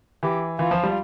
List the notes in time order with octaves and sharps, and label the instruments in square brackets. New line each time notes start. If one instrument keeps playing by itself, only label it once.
[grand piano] E3 [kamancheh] G4
[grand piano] E3 [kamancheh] F4
[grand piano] F3
G3